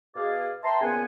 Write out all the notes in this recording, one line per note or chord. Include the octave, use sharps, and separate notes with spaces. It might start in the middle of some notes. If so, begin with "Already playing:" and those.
B2 G#4 D5 F5
B4 E5 G5 A5 A#5 C6
A#2 C#3 B3 F#5 G#5